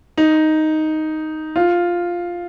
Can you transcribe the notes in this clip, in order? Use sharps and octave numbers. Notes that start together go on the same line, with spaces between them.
D#4
F4